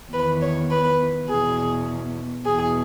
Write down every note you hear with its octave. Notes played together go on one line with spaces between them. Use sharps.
E2 D#3 B4
C#5
B4
E2 B2 G#4
E2 B2 G#4